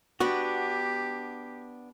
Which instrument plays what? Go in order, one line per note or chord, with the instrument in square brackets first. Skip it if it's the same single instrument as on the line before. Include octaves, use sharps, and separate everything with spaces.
[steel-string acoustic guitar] B3 D4 [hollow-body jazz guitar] F#4 [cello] G4